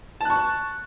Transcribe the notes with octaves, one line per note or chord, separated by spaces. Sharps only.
A5 C#6 F#6